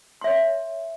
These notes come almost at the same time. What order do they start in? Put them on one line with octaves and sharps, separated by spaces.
C6 E5 C#5